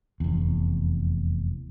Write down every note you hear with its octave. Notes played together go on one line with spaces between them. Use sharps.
F1 E2